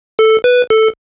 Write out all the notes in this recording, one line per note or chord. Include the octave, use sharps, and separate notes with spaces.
A4
B4
A4